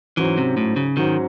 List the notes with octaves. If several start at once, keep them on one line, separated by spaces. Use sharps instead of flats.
G#2 E3 F#3 C#4 F#4 C5
C3
A2
C#3
G#2 D#3 F#3 C#4 F#4 C5